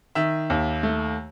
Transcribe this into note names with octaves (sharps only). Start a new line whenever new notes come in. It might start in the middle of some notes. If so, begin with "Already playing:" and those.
D#3 E5
D#2
A3